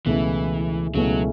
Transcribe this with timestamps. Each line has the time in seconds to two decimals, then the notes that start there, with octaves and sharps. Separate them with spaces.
0.06 C#2 B2 E3 A3 C#4 E4
0.94 C#2 B2 F#3 A3 C#4 E4